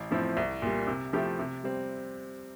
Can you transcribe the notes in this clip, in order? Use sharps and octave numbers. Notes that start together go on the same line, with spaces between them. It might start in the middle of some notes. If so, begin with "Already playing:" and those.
Already playing: A1
A2 F3 C4 E4
C2
A#2 G3
C3
F3 A3 E4 G4
C3
G3 C4